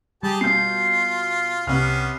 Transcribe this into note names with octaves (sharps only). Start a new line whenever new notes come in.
G3 G4 G#4 A5
B2 F4 G6 C7
C2 C3 B3 C#4 F6